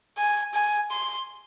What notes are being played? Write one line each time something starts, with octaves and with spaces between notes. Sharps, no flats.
G#5
G#5
C6